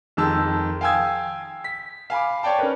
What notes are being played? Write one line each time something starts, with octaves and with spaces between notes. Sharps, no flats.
F2 D#3 G#3 A5 E6
F5 G5 G#5 D#6 E6 G#6
B6
F5 G#5 B5 D6
C#5 D5 G5 A5
C#4 A#4 B4